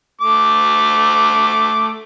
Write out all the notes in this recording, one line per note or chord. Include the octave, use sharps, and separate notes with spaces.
A3 D6